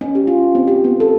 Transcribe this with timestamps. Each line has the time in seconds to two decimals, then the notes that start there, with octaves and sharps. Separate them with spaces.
0.01 C#4
0.15 G4
0.27 F4
0.55 C4
0.67 G4
0.84 B3
1.00 A4